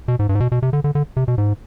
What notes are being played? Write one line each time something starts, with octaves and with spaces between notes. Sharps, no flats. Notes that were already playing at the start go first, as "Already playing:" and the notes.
B2
G#2
G2
G#2
B2
B2
C3
D3
D3
D3
C3
B2
G#2